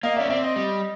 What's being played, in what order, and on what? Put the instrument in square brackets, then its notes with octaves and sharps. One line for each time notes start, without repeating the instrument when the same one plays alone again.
[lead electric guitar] A#3 [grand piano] D#5 F5
[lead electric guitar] C#4 [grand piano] D5 E5
[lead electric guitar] C4 [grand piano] D5 E5
[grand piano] D#5
[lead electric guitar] G3 [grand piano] D#5